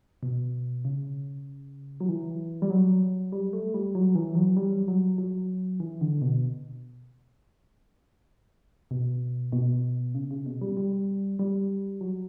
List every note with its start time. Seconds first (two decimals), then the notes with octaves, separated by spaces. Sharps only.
0.23 B2
0.85 C#3
2.00 F#3
2.09 E3
2.62 G3
2.70 F#3
3.32 G3
3.53 A3
3.74 G3
3.95 F#3
4.15 E3
4.35 F#3
4.57 G3
4.88 F#3
5.18 F#3
5.80 E3
6.01 D3
6.22 B2
8.91 B2
9.52 B2
10.15 C#3
10.31 C#3
10.46 B2
10.61 G3
10.77 G3
11.39 G3
12.01 F#3